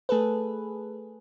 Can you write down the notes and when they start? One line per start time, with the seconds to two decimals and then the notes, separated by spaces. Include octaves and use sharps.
0.09 A3 G#4 A4 B4